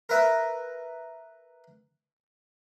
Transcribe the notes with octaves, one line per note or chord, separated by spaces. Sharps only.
A#4 B4 E5